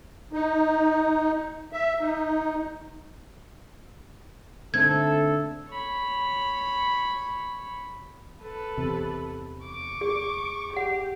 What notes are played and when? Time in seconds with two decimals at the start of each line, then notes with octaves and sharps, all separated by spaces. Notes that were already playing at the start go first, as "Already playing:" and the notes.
0.33 D#4
1.73 E5
2.00 D#4
4.74 D3 A3 C4 D#4 A4 G#6
5.69 C#5 B5
8.42 A4 B4
8.78 E2 C3
9.65 C#6 D6
10.01 G#4
10.74 G4 G#4 F#5